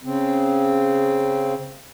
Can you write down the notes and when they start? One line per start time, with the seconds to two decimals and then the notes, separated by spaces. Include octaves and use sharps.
0.04 C#3 C4